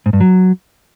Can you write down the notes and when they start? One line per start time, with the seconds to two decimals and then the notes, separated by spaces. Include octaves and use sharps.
0.06 G#2
0.13 G2
0.21 F#3